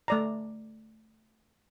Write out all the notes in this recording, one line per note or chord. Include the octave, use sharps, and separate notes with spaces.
A3 D5 A#5